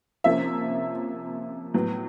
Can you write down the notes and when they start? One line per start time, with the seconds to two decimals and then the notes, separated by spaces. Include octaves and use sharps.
0.24 C3 F3 A#3 C#4 E5
1.74 A2 F#3 B3